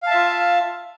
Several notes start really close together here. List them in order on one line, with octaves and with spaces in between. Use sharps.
F5 A5 E5 F4